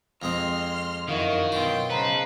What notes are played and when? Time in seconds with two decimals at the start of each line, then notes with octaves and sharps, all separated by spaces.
0.22 F2 G#3 C4 C6 F6
1.09 F#2 D#3 E4 F#4 A#4 D#5 F5
1.52 B1 F4 G5 C6
1.90 C#3 B4 C5 D#5 A5 A#5